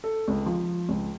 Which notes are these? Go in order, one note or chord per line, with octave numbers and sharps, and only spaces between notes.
A4
C#2
F3
C#2